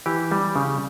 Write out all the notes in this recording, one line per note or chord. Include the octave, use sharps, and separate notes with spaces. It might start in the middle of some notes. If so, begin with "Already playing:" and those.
E3 G4
G3
C#3